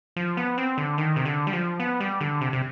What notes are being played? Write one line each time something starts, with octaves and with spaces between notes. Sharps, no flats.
F3
B3
C4
D3
D#3
C3
D3
G3
F3
B3
G3
D3
C3
C3